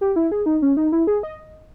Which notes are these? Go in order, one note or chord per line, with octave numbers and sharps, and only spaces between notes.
G4
E4
G#4
D#4
C#4
D#4
E4
G#4
D#5